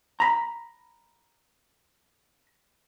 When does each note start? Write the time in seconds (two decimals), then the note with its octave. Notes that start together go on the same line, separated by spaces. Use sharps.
0.20 A#5 B5